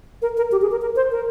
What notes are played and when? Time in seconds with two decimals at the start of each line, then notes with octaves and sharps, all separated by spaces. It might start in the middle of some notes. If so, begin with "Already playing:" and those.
0.22 A#4
0.37 A#4
0.52 G4
0.62 G#4
0.71 A#4
0.82 A#4
0.96 C5
1.11 A#4